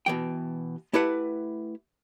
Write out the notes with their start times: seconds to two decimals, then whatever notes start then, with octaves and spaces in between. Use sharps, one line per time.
0.06 B2 E3 G5
0.93 A3 E4 G4 B4 E5 F#5